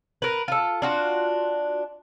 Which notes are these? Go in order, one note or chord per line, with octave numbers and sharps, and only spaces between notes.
A#4 B4
F4 A4
D4 F4 F#4